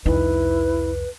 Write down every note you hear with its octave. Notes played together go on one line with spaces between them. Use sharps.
C2 F2 D#4 E4 B4